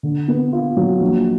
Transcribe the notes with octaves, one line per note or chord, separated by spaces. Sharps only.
D3
B3
F4
F#3
A#1